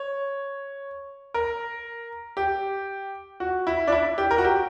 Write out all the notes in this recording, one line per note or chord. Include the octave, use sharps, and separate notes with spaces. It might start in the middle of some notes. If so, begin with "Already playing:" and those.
Already playing: C#5
A#4
G4
F#4
E4
D4
E4
G4
A#4
F#4
G4